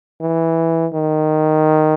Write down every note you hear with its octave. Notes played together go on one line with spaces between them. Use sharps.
E3
D#3